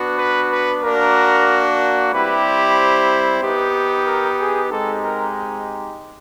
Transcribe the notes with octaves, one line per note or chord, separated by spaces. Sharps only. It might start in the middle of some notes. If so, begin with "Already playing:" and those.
Already playing: B3 D4 F#4
B4
B4
A#3 D4 F#4 A#4
G3 C4 E4 G4 B4
C5
B3 D#4 G4
A#4
G#4
G#3 C4 D#4 G4 A4
A#4